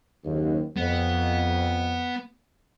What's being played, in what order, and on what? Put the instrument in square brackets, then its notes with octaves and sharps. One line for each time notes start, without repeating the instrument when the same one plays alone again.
[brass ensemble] F#1 D#2
[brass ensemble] F2 [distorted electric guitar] B3